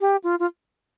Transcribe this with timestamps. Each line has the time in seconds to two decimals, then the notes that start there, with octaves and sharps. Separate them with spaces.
0.01 G4
0.24 F4
0.39 F4